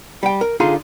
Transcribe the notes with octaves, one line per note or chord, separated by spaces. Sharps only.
G3 G5
A#4
D3 D#4 F4 G#4 F5 C6